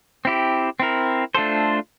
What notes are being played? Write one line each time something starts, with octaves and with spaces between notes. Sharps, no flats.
C4 E4 G4
C4 E4 A#4
A3 D4 F4 A4 C5